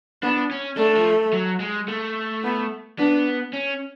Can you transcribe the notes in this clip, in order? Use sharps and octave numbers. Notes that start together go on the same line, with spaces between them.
B3 D4
C#4
A3 D4
F3
F#3
G#3
A3
B3
B3 D4
C#4